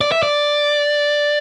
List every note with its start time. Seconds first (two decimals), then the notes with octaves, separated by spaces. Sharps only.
0.01 D5
0.12 E5
0.23 D5